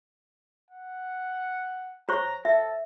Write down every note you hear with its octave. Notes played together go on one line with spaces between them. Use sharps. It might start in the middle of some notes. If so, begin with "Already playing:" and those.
F#5
C5 C#5 A#5 C#6
A4 E5